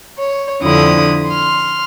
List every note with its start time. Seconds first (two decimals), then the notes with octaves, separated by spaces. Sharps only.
0.18 C#5
0.62 F2 D3 E4 F4 D#6
1.27 C6 F6